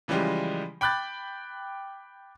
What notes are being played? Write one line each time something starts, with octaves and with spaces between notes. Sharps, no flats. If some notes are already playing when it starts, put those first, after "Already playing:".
C#3 E3 F3 G3 G#3 G4
G5 B5 D6 F#6 G6 A6